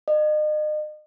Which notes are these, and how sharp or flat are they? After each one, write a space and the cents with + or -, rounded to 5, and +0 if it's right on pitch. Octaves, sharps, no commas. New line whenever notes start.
D#5 -40